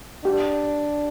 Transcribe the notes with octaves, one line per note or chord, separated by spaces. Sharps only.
D4 G4